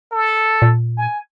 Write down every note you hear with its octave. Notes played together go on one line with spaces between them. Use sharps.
A4
A#2
G#5